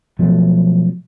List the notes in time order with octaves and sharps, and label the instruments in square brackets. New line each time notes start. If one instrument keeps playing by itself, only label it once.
[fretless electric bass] B2 F3 F#3 A3